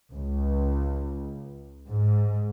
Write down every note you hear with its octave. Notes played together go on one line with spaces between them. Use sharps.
C#2
G#2